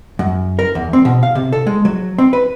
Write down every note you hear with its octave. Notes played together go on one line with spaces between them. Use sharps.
F#2
A#4
E2
C4
B2
F5
C3
A4
G#3
F#3
C4
B4